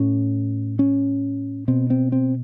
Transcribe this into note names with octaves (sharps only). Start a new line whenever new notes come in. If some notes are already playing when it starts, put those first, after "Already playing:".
Already playing: A2 C#4
C#4
B2 C4
C4
C4